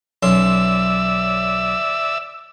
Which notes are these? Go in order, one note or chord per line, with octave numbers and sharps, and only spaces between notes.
B1 C#4 D5 E5 C6 E6